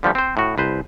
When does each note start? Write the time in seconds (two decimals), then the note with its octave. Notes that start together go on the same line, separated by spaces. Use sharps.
0.03 D3 F3 G3 A3
0.15 C4 C5
0.37 A2 F#4
0.58 C2 B4 C5